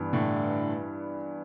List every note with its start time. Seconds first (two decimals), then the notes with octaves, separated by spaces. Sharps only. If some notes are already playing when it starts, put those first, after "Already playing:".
Already playing: G2 E3 G3 B3
0.13 A2 D3